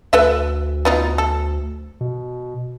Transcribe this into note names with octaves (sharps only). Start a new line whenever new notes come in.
D2 A4 B4 E5
B3 D#4 F4
A4
B2